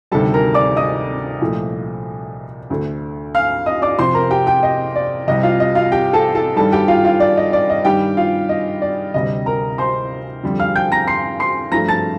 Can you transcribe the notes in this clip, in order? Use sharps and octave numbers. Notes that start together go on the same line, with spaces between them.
D2 C3 D#3 G3 A4 A5
A#4 A#5
D5 D6
D#5 D#6
C2 A#2 F3 A3
D2 D3 A3
F5 F6
D#5 D#6
D5 D6
F2 C3 F3 C5 C6
A#4 A#5
G4 G5
G4 G5
D#5
D5
C2 C3 G3 D#5
F4 F5
D#5
F4 F5
G4 G5
A4 A5
A4 A5
G2 D#3 G3 A4 A5
G4 G5
F4 F5
F4 F5
D5
D#5
D5
D#5
G2 D#3 G3 G4 G5
F4 F5
D#5
D5
D2 C3 G3 D#5
A#4 A#5
C5 C6
F2 D3 G3
F5 F6
G5 G6
A#5 A#6
C6 C7
C6 C7
G2 F3 A3 A#5 A#6
A5 A6